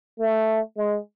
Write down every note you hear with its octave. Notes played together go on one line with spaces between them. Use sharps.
A3
G#3